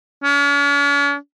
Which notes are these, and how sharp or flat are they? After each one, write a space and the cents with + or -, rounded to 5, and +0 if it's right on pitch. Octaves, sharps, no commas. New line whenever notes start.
C#4 +45